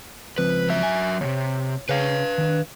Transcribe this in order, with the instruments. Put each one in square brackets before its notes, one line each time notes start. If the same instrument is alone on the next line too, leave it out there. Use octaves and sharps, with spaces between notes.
[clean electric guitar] C#2 F3 C4 [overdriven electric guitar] B4
[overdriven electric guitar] F#3 E5
[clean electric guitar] G#5
[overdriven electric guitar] D#2 C3 [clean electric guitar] C#5
[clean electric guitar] C#3 G#4 C#5 [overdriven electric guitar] B4 F5
[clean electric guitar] D#3 D4